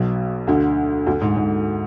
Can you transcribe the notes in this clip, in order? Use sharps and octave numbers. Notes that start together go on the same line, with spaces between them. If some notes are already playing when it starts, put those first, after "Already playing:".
Already playing: B1 B2
D2 D3
D2 D3
G#2
G#2